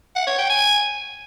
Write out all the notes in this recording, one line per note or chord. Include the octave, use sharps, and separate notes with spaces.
F#5
C#5
G5
G#5